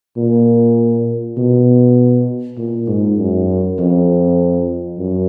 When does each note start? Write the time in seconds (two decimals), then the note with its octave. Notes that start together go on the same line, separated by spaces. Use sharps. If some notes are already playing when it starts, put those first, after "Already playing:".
0.17 A#2
1.37 B2
2.58 A#2
2.88 G#2
3.18 F#2
3.79 F2
4.99 F#2